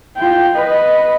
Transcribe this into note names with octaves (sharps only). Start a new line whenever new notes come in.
F4 G5
B4 D#5